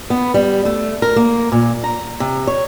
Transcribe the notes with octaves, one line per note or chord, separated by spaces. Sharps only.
B3
G3
A3
A#4
A#3
A#2
A#5
C3
C#5